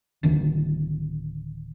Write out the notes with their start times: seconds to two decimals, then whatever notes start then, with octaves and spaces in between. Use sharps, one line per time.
0.23 D1 D2 D#3